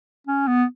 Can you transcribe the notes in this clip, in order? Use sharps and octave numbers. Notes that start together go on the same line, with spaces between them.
C#4
B3